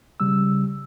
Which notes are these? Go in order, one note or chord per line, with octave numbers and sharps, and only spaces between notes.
C#3 G3 E6